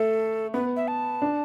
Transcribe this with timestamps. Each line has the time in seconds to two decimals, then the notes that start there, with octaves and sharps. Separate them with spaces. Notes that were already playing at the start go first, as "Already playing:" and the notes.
Already playing: A3 A4
0.54 B3 B4
0.76 E5
0.88 A5
1.22 D4